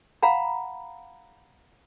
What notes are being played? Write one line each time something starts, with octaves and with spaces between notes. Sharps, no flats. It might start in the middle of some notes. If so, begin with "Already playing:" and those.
F5 F#5 A#5 B5